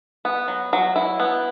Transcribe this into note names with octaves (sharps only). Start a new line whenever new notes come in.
B3
F#3
F#3
E4
B3